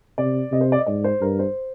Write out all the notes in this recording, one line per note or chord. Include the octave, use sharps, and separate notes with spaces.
C3 D5
C3 D#5
C5
D5
D#5
G#2 D5
C5
G2 A#4
C5